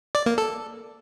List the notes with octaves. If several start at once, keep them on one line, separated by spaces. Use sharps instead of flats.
D5
A#3
A4